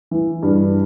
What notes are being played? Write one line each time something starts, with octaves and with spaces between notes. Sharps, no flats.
E3
G2